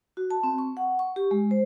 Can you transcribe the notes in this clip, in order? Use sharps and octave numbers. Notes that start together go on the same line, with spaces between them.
F#4
A5
C4
C#6
F#5
C#6
G4
G#3
C5